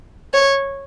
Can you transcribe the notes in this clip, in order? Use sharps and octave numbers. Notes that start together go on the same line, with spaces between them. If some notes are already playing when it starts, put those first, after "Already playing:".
C#5